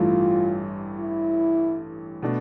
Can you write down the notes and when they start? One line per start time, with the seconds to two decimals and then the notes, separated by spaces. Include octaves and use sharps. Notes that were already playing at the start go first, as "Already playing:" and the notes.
Already playing: A1 G2 E3 A3 F4
1.00 E4
2.22 B2 A3 D4